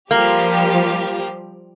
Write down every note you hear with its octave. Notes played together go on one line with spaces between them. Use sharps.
F3 G3 A#3 G4